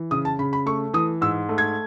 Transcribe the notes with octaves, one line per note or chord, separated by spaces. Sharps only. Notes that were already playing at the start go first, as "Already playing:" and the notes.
Already playing: E3
C#3 D#6
A5
C#3 B5
B5
A3 C#6
E3 D#6
G#2 E6
A3
G#6